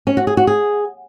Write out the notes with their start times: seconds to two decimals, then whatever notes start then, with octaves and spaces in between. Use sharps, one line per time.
0.07 C#4
0.17 F#4
0.27 G#4
0.37 F#4
0.47 G#4